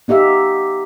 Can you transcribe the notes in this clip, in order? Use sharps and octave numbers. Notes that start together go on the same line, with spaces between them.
B3 D#4 G4 E5 F5